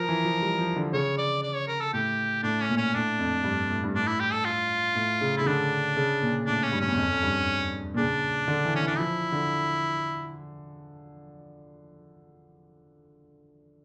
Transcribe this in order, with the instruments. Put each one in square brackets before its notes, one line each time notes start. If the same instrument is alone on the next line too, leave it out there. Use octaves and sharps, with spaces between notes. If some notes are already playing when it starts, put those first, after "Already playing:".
Already playing: [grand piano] F3 [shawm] A#4
[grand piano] E3
F3
G3
F3
D3
[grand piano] C#3 [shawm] C#5
[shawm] D5
D5
C#5
A#4
A4
[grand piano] A2 [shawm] G4
[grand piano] A2 [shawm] D4
[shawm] C#4
[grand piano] A#2
[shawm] C#4
[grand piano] A2 [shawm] D4
[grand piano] F2
G2
A2
G2
[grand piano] A2 [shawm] D4
[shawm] E4
G4
A4
F4
[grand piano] A2
C#3
[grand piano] C#3 [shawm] E4
[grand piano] D3 [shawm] D4
[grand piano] C#3
A#2
[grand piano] A2 [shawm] D4
[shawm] C#4
[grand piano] G2
[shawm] C#4
[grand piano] E2
F2
F2
G2
A#2
[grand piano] C#3 [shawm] D4
[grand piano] D3
E3
[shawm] C#4
[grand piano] E3
[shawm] D4
[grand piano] F3 [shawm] E4
[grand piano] D3